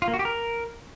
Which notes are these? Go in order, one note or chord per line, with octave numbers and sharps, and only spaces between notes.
F4
A#3
F#4
G4
A#4